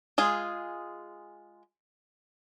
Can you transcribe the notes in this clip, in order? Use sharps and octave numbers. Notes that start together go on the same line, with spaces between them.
G#3 F4 G#4